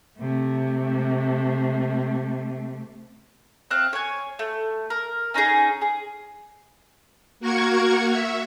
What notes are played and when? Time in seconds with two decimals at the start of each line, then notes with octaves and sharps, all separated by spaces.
0.19 C3 A3
3.71 C4 E5 F5 F#6
3.93 C#5 G#5
4.39 A3
4.90 A#4
5.34 C#4 D#4 F#4 G#4
5.81 G#4
7.40 A#3 F#4 A#4 C#6 G#6
8.10 E5